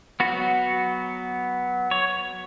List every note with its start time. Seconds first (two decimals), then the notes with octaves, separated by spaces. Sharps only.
0.20 F#3 B3 F#4
1.91 C#5